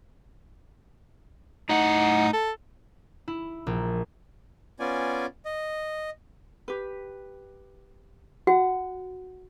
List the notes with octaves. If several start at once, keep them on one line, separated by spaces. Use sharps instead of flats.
A2 D#4 F#5
A4
E4
A#1
B3 C#4 F4 D5 G#5
D#5
G4 B4
F#4 F#5